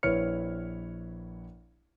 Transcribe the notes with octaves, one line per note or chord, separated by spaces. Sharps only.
A#1 E4 B4 C#5 F6 C#7